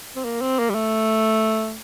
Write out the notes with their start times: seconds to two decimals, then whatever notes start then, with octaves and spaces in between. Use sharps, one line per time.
0.16 C4
0.25 A#3
0.41 C4
0.59 A#3
0.70 G3
0.75 A3